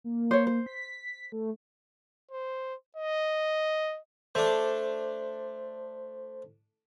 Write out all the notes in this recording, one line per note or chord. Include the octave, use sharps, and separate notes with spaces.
A#3
C5 C#5
C5
B6
A3
C5
D#5
A3 D4 C5